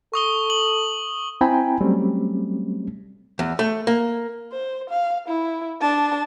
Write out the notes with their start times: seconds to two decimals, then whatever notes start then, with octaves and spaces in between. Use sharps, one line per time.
0.14 A4 C#6 D#6 G7
0.50 F#7
1.41 C4 E4 G5 G#5 A#5 B5
1.81 F#3 G3 A3 C4 C#4
3.39 E2
3.59 A3
3.87 A#3
4.52 C5
4.90 F5
5.28 E4
5.81 D4 A5